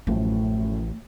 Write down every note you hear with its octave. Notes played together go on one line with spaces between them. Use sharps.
A1 F#2 A2 F3 A3